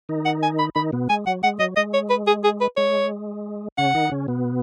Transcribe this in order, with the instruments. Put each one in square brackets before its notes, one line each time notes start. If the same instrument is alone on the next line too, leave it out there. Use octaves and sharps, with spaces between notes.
[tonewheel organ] D#3 D#4
[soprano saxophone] F#5
G#5
B5
[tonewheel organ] D#3 D#4 [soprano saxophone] B5
[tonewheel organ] B2 B3
[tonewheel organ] G#3 [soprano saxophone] G#5
[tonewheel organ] F#3 [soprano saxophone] F#5
[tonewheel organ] G#3 [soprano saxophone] F#5
[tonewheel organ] F#3 [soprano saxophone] D#5
[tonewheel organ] G#3 [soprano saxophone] D#5
[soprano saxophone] C#5
B4
G#4
G#4
B4
[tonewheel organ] G#3 [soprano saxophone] C#5
[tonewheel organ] C#3 C#4 [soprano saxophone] F#5
[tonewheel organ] D#3 D#4
C#3 C#4
B2 B3